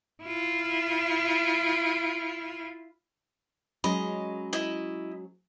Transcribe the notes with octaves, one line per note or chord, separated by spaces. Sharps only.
E4 F4
F#3 G#3 C#4 D#5 B5
E4 D#5